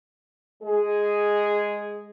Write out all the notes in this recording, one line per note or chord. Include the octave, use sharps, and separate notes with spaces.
G#3 G#4